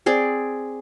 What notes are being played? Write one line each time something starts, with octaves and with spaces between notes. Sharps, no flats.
C4 G#4 D5